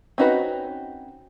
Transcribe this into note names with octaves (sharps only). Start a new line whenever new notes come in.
C4 C#4 D#4 F#4 B4